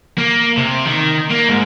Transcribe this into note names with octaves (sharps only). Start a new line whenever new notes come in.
A#3
C3
D#3
A#3
G#2